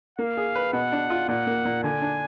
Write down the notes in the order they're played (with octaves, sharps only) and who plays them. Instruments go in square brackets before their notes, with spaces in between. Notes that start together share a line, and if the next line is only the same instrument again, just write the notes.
[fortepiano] A#3 [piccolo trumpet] F5
[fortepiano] G#4
B4
[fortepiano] B2 [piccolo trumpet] F#5
[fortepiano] D4
F4
[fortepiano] A#2 [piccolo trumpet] F#5
[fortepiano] A#3
A#2
[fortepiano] D3 [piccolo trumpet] G#5
[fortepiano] D4